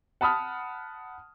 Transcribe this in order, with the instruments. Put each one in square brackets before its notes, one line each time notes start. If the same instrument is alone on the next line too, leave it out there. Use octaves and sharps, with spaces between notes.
[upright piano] F#5 A5 B5 D#6 F6